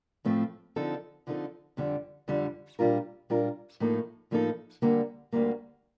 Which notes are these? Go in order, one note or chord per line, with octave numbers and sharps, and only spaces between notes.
A2 F3 A3 C4
D3 F3 C4 D#4 A4
D3 F3 C4 D#4 A4
F2 D3 G3 D4
F2 D3 G3 D4
A#2 G3 D4 F4 A#4
A#2 G3 D4 F4 A#4
A2 F3 A#3 D#4 A4
A2 F3 A#3 D#4 A4
D2 D3 G3 A#3
D2 D3 G3 A#3